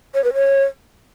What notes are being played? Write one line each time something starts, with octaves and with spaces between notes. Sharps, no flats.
C#5
B4
C#5